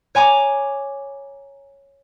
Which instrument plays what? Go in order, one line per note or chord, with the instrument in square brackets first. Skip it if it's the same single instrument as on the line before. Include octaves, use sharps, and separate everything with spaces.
[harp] C#5 G#5 A#5 D6